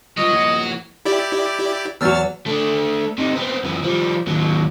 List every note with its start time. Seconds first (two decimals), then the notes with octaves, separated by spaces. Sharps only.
0.18 G3 G#3 F4 F#4 C#5 D#5
0.33 F3 A#3 E4
1.05 E4 G4 D5
2.01 E2 F#3 F#4 E6 F6 A6
2.46 A3 D4
3.18 C3 D#4
3.35 B3 C4
3.64 F#2 E3
3.83 F3 G3
4.27 D#2 F#3